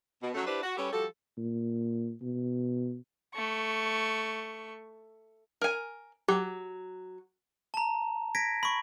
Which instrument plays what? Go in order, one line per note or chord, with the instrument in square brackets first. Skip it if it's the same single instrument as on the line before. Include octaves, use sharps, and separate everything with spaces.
[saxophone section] B2
F#3 A3 C#4
D4 E4 G4 B4 C5 D5
F#4
G3 C#4 G4 A4 B4 C#5
F3 G3 F#4 G4 A4
[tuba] A#2
B2
[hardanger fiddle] A3 C#6
[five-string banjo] A#4 G#5
[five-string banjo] F#3 [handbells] G4
[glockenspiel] A5 A#5
G#6 A#6 B6 D7
B5 C#6